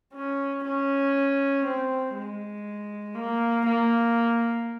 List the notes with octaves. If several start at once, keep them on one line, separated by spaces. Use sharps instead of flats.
C#4
C#4
C4
G#3
A#3
A#3